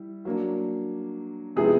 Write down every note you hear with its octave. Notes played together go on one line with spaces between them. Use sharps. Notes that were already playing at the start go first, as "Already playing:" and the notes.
Already playing: G3 E4
F#3 A#3 D4
C3 F3 G#3 B3 E4 G#4